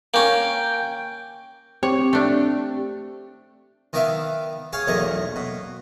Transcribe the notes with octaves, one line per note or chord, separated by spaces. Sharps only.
A#3 C#4 G5
C4 G4 C#5
A3 D4
D#3 B3 D5 E5 F5
G#4 C#5 F5
B1 E2 A3 A#3 D#5
B2